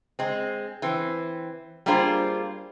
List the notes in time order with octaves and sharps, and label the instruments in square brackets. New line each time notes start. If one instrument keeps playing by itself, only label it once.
[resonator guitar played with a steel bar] G#3 C4
E3 C4
G3 A#3 D4 F4 G#4 C5